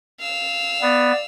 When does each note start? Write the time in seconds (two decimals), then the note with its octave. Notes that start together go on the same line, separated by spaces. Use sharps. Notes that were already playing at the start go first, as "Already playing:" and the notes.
0.20 F5 E6
0.82 B3 D5